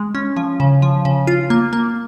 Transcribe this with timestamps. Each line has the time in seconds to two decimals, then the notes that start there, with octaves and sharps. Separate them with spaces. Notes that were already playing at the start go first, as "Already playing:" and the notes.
Already playing: G#3
0.15 C#4
0.36 F3
0.60 C#3
0.82 F3
1.05 C#3
1.27 F4
1.50 A#3
1.73 A#3